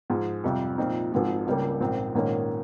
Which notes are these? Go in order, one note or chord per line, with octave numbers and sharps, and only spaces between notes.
G#2 F3 G#3
F2 C3 G3
A#2 F3 C4 D#4
G#1 G#2 F3
C#2 C#3 G3 A#3
A#1 G#2 F3 C4
A#1 G#2 D#3 A#3 C#4